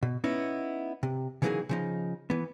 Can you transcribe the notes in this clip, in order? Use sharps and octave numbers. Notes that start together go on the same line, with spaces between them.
B2
B3 C#4 D#4 E4
C3
C#3 E3 F#3 A#3 D#4 G#4
C#3 F3 D#4
E3 B3